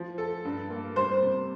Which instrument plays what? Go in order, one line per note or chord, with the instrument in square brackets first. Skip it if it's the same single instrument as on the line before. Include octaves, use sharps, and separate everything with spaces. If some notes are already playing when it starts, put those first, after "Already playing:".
Already playing: [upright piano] F3
A4
G2
A#3
[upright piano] G3 [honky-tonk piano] C5
[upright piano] C3